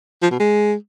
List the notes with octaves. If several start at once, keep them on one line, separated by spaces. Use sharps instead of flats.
F3
B2
G#3